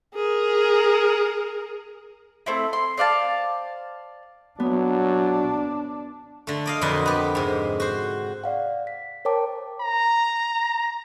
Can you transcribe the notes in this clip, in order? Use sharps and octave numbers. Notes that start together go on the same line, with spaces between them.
G#4 A#4
A3 C4 E4
C6
C5 D5 F5 A5
F#3 B3 D4
D3 A3
D5 D#5 F5
F2 A#2 D3 F#3 B4 D#5
B3 G4
G#2 C3
F#4 C5
D5 F5 F#5
B6
A#4 C5 C#5 G5 A5 D6
A#5